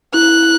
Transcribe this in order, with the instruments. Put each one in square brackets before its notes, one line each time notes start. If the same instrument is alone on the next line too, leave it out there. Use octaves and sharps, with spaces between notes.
[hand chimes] E4 [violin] F#6